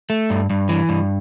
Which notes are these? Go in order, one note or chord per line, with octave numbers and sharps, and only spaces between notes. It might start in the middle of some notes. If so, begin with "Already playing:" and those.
A3
G2
G2
E3
G2